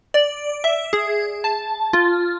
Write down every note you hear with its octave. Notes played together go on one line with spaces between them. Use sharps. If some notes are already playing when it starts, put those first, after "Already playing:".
D5
E5
G#4
A5
F4